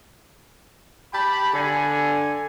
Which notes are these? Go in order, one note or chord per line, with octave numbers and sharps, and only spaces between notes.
G4 G5 A5 B5
D3 G#5